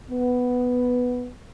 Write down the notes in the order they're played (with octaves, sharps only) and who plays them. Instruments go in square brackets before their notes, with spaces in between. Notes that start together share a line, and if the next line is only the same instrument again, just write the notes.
[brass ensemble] B3